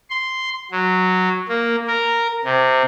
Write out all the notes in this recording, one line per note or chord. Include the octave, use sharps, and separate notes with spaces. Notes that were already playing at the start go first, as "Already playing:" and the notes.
C6
F#3
A#3
A#4
C3